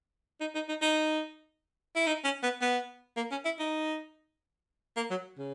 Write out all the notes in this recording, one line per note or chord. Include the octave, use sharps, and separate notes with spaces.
D#4
D#4
D#4
D#4
E4
D#4
C#4
B3
B3
A#3
C#4
E4
D#4
A#3
F#3
C#3